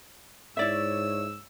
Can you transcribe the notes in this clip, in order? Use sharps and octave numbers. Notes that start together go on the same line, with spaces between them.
G#2 E4 C#5 D5 E5 E6